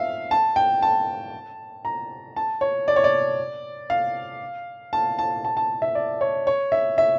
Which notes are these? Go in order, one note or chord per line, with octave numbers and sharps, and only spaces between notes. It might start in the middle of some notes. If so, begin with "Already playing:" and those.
Already playing: E5 F5
A5
G5
A5
A#5
A5
C#5
D5
C#5
D5
F5
A5
A5
A5
A5
E5
D5
C#5
C#5
E5
E5